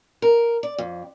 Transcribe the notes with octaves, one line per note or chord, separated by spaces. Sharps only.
A#4
D5
F2